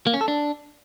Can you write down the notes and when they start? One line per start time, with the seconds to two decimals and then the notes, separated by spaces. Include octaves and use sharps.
0.07 A#3
0.14 C#4
0.21 A4
0.28 D4